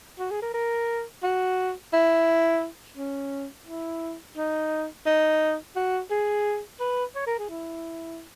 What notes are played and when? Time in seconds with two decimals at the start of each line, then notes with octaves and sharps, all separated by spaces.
0.19 F#4
0.31 G#4
0.42 A#4
0.54 A#4
1.23 F#4
1.93 E4
2.97 C#4
3.67 E4
4.37 D#4
5.06 D#4
5.76 F#4
6.11 G#4
6.80 B4
7.15 C#5
7.27 A#4
7.39 G#4
7.50 E4